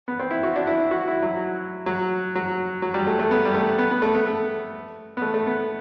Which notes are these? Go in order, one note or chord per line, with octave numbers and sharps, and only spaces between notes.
B3
C4
E4
F#4
D4
E4
F#4
E4
F#3
F#3
F#3
F#3
G3
A3
A3
B3
G3
A3
B3
B3
A3
B3
A3
B3
A3
A3
B3